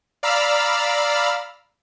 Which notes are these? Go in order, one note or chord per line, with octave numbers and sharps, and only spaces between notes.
D5 F5 A#5 B5 E6 F6